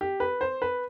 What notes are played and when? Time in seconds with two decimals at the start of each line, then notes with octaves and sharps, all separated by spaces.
0.01 G4
0.20 B4
0.41 C5
0.62 B4